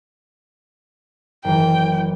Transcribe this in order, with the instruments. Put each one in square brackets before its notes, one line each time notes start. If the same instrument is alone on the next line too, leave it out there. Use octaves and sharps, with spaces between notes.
[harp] F#1 E3 [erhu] G5